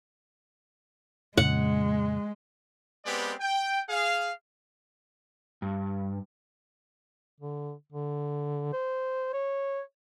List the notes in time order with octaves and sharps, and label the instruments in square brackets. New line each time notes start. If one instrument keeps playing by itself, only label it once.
[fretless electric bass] F2 A#2 C#3 [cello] G#3 [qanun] F#5
[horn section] G#3 B3 C4 G4 B4 D5
G5
G#4 F5
[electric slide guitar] G2
[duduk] D3
D3
C5
C#5